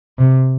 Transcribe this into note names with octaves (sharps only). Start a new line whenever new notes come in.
C3